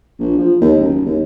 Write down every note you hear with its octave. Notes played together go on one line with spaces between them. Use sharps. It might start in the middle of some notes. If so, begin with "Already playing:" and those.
A#1
F3
D#2
F#1
D#2